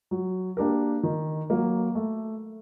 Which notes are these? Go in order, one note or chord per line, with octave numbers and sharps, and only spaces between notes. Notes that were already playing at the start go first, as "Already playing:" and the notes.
F#3
A#3 D4 G4 A#4
D#3
F#3 A#3
A3